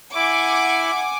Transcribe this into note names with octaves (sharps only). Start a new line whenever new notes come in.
E4 F#5 G#5 D6